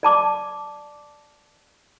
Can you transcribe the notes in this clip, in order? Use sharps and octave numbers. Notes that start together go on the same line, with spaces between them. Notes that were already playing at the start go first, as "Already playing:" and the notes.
D5 A5 D6